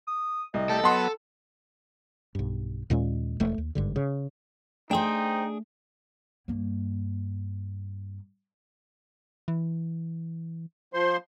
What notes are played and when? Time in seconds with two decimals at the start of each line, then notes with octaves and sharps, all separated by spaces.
0.07 D#6
0.54 C2 D#5
0.69 G3 A3 A4
0.84 F#3 B3 F#5 A5 C6
2.35 B1 G2
2.90 D#2 A#2 G#3 C#4
3.40 E1 A3
3.58 D#2
3.75 G#1 G2 D3
3.96 C#3
4.91 A3 D4 D#4 G#4 C5 G5
6.48 G2 A#3
9.48 E3
10.94 F3 C5 C6